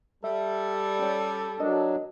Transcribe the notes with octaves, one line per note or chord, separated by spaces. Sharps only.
G3 A4 E5
C#4 C#5
F#3 D4 A#4 D#5